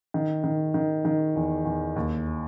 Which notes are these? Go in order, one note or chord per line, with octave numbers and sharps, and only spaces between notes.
D#3
D#3
D#3
D#3
E2
E2
D#2